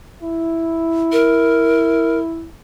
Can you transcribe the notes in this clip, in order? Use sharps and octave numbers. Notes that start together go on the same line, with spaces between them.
E4
A#4